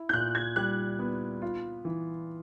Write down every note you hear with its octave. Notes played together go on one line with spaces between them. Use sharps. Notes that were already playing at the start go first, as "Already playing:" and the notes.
Already playing: E4
G6
A#2 F#6
G#6
G3 F#6
B3
F4
E3